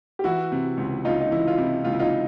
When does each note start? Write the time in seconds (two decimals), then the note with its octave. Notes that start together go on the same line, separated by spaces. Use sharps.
0.19 G4
0.24 E3 E4 F#4
0.52 C3
0.77 C#2
1.05 C#2 D#4 F4
1.21 D#4
1.31 E3 E4
1.47 F4
1.58 C3 E4
1.84 C#2 F4
1.92 E4
1.99 D#4 F4